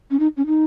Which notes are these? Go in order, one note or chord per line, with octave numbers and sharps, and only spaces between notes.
C#4
D#4
C#4
D#4